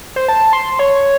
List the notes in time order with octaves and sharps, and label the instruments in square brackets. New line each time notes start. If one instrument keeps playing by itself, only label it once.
[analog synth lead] C5
A5
C6
C#5